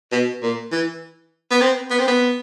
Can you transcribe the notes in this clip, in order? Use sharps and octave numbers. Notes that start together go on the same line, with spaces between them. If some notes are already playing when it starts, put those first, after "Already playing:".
B2
A#2
E3
B3
C4
B3
C4
B3